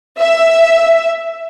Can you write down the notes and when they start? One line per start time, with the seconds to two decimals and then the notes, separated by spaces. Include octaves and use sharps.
0.19 E5